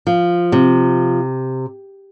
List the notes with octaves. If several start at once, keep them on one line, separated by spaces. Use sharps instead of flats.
F3
C3